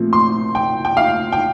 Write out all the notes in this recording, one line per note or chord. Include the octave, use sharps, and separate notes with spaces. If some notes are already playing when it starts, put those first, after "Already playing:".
Already playing: A#2 F3 A3 C4
C6
G5
G5
F5
G5